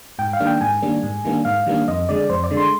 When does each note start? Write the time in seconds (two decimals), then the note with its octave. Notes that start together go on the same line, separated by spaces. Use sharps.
0.19 G#2 G5
0.33 F5
0.40 D#3 G3 A#3 D4
0.47 G5
0.61 G#2 G#5
0.82 D#3 G3 A#3 D4
1.03 G#2
1.25 D#3 G3 A#3 D4
1.45 G#2 F5
1.67 D#3 G3 A#3 D4
1.88 F2 D#5
2.09 D3 G#3 D5
2.29 F2 C5
2.44 D5
2.51 D3 G#3
2.57 C6